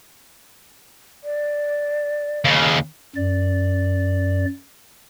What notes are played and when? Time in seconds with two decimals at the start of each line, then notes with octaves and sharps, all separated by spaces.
1.24 D5
2.45 D#2 C#3
3.16 F#2 D5